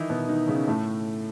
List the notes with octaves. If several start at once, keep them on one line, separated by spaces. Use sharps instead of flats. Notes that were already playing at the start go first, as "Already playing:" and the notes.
Already playing: D#3 E3 D#4 E4
B2 B3
D#3 D#4
C#3 C#4
A2 A3